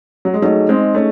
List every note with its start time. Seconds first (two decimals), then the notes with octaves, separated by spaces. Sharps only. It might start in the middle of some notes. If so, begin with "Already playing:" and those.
0.25 F#3
0.34 G#3
0.42 F#3 A3 D#4 G#4 D#5
0.69 G#3 C4
0.95 A3 C#4